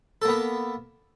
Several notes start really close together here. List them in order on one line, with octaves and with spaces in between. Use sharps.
A4 A#3 B3